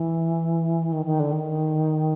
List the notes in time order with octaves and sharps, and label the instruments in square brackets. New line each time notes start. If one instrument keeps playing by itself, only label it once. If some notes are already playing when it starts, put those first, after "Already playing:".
Already playing: [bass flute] E3
D#3
D#3
D3
D#3